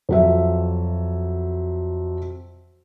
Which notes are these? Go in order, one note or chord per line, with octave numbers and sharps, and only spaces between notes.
F2 F#3 E5